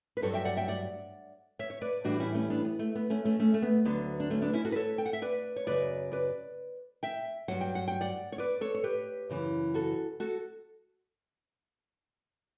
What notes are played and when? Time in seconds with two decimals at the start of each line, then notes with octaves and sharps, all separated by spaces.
0.17 B4
0.22 G2 F#3 A4 C#5
0.34 E5 G5
0.45 D5 F#5
0.57 E5 G5
0.68 D5 F#5
1.59 C#5 E5
1.70 C#5
1.81 B4 D5
2.04 A2 E3 G3 D4 F#4
2.20 C#4 E4
2.34 A3 C#4
2.50 B3 D4
2.65 B3
2.79 A3
2.95 B3
3.10 A3 C#4
3.25 A3 C#4
3.40 A3 C#4
3.54 A3
3.62 B3
3.85 D2 D3 F#3 B3
4.20 D4
4.30 A3 C#4
4.42 B3 D4
4.53 C#4 E4
4.65 F#4 A4
4.72 B4
4.76 A4 C#5
4.98 G5
5.06 F#5
5.13 E5
5.22 B4 D5
5.56 C#5
5.67 F#2 C#3 F#3 B4 D5
6.12 B4 D5
7.03 E5 G5
7.48 G2 F#3 F#5
7.61 G5
7.75 F#5
7.88 G5
8.01 D5 F#5
8.32 C#5
8.38 B4 D5
8.61 A4 C#5
8.75 C#5
8.84 G4 B4
9.29 F#2 C#3 E3
9.74 F#4 A4
10.20 F#4 A4